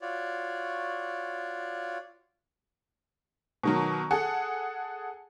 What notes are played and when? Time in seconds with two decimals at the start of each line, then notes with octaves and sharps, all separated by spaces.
0.01 F4 F#4 C#5 D5
3.63 B2 D#3 F#3
4.11 G#4 A4 F#5